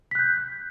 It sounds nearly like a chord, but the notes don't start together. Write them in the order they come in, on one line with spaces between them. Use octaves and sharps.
B6 F#6 G6